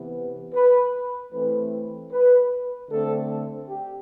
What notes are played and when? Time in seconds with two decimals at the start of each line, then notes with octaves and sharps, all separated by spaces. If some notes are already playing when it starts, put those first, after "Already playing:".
Already playing: C3 E3 B3
0.54 B4
1.33 E3 A3 C4 B4
2.12 B4
2.90 D3 A3 C4 A4
3.69 G4